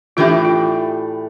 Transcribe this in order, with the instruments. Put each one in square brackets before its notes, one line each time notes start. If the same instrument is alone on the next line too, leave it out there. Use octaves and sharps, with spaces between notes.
[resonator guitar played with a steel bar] A2 E3 A3 D4 G4 [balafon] F4
[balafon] F4